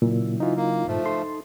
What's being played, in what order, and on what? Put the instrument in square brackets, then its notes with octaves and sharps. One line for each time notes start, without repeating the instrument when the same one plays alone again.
[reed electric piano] A#2 [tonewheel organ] C#3 F#3 E4
[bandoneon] E3 [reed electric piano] D#4 F4
[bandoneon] A#3
[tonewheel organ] G2 A#2 [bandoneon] F3 A3
[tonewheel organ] D#4 A4 [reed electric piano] C6